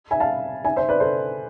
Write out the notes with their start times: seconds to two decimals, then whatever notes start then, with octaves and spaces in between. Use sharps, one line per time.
0.11 E5 G#5
0.20 F5 A5
0.65 E5 G#5
0.76 C5 E5
0.89 B4 D5
1.00 A4 C5